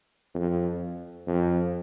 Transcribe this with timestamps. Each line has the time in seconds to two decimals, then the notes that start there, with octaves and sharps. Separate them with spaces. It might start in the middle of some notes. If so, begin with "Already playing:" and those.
0.35 F2
1.27 F2